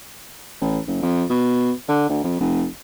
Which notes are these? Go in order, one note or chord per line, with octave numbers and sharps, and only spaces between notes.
A1
F#1
F2
B2
D3
D2
F2
F1